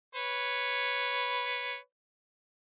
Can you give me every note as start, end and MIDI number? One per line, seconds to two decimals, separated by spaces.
0.15 1.76 71
0.15 1.76 73